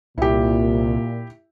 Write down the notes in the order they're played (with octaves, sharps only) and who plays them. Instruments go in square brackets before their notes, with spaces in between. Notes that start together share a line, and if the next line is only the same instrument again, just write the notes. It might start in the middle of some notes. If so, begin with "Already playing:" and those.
[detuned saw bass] C2 [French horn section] A#2 [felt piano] E4 G4